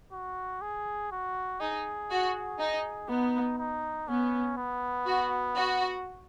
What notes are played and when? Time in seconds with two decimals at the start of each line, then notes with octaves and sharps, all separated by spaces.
0.12 F#4
0.61 G#4
1.11 F#4
1.60 D#4 G#4
2.10 F#4
2.59 D#4
3.08 B3 D#4
3.58 D#4
4.07 B3 C#4
4.57 B3
5.06 F#4
5.56 F#4